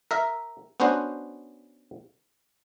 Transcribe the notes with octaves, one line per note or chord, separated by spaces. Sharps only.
A#4 E5
B3 C#4 D4 F#4 C5